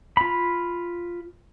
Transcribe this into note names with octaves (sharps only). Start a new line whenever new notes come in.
F4 B5